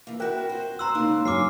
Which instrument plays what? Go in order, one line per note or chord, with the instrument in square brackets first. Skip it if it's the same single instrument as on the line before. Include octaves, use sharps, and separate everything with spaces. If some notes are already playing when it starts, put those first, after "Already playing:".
[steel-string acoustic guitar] E3 A#3
[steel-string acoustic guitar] E4 F#4 [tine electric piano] A#4 G5 F#6
[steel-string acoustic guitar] F#4 C5
[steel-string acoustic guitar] D2 C5 [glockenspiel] A#5 C6 E6 [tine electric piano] F#6
[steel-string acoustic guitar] C#3 G#3 A#3 [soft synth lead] D#4
[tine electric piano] G2 F#3 [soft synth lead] G#5 [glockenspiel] D6 F6 C7